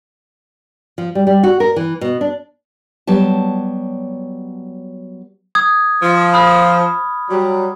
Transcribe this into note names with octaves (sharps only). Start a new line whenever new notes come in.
F3
G3
G3
F#4
A#4
E3
B2
D4
F#3 G3 B3 A5
D#6 G#6
F3
B5 D#6 F6
F#3 G3